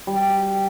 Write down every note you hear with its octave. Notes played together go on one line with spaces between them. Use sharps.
G3